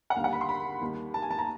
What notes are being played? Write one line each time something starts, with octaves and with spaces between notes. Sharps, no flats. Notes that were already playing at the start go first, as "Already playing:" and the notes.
F#5
D#2 D3 G3 F5
F#5
B5
C6
B5
D#2 D#3 G3
A5
G#5
A5
A#5